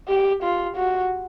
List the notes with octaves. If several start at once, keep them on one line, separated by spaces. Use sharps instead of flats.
G4
F4
F#4